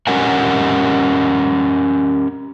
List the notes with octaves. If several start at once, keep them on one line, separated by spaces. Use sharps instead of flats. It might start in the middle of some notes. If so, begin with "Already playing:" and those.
C#4 G4 A#4 D#5 F#5 G#5